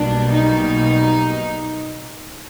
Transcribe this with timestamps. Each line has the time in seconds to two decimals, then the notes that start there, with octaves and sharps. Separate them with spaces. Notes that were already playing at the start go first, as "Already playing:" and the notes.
Already playing: B1 B2 G3 A#3 D4
0.31 D#4